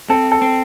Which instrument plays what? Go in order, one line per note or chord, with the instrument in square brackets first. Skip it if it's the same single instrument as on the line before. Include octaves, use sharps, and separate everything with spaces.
[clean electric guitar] C4 [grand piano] A4
[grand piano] A4
[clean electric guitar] C4